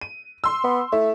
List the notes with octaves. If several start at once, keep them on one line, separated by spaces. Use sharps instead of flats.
D#7
C6 E6
B3
A3 E4